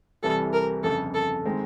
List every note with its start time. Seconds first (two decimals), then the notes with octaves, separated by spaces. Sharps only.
0.23 C2 C3 E3 G3 A4
0.53 A#4
0.83 G1 F2 C#3 A4
1.14 A4
1.45 D#3 G#3 C4